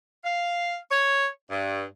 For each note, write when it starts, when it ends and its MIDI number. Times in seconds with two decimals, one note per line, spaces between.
0.24 0.75 77
0.90 1.26 73
1.50 1.84 43